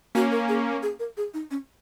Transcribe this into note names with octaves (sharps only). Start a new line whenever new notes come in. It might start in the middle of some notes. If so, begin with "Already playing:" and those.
A#3 C#4 F#4
A#4
G#4
G#4
A#4
G#4
D#4
C#4